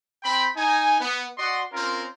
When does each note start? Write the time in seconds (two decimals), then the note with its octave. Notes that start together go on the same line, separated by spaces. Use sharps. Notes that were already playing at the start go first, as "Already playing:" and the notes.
0.23 C4 G5 B5
0.57 D#4 G#5
1.00 B3
1.37 F#4 D5 D#5 F#5 C6
1.73 C4 C#4 F4 A#4